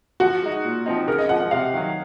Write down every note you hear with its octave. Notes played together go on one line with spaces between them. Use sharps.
F3 F#4
G#3 D#4
A#2
F3 C4 D#4
C#3 A#4
D#5
F3 G#3 F#5
F#5
C3 F5
D#3 F#3